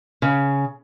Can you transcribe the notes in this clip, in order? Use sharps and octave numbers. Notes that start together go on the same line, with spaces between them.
C#3